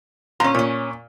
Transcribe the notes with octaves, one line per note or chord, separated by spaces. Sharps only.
A#2 C#4 A#5 C6
A#2 C#4 C#5